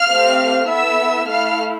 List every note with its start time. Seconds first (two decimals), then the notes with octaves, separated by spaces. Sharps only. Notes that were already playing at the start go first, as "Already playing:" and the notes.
Already playing: F5 F6
0.09 A3 C4 G4
0.68 B3 E4 A4 E5 E6
1.28 A3 E4 A4 F5 F6